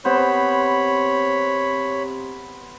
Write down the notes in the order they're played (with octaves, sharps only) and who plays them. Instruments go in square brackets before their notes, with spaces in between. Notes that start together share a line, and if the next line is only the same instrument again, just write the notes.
[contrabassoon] C3 [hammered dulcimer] B3 C5 [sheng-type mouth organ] C#5 B5